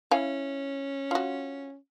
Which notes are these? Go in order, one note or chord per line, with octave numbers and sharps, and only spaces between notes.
C#4 E4 F5 G#5
F4 F#4